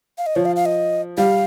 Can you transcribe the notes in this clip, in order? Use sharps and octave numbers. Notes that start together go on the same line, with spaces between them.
F5
D#5
F3 C#5
F5
F5
D#5
G3 F5